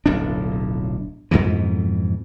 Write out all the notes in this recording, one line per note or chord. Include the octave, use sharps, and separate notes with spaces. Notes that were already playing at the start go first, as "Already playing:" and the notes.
D1 B1 F2 D4
F2 G#2 B2 E3